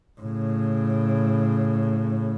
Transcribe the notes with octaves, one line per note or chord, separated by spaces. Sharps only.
A2 C#3